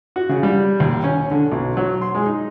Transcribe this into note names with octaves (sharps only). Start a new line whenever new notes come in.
F#4
C#3
G3
D#2
C#4
D3
B1
F#3
C6
G#3
D#4